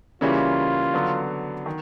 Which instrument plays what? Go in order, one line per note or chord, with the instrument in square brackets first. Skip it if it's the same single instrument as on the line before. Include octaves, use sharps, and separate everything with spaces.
[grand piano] C#3 E3 G3 A#3 C#4 [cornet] F4
[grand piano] D3 F#3 B3
D#3